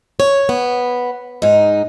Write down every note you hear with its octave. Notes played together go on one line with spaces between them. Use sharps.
C#5
B3
G#2 D#4